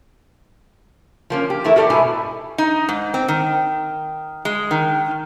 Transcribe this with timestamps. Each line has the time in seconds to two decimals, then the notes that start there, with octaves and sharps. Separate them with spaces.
1.30 F3 A#3 C#4
1.50 G4
1.64 E2 A3 E4 A#4
1.76 F#4 G4 A4 A#4 D5
1.90 G#2 B2 E4 G#5
2.58 D#4
2.89 G#2
3.14 C4
3.28 D#3
4.45 G#3
4.71 D#3